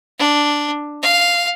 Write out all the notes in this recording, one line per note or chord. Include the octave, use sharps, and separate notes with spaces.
D4
F5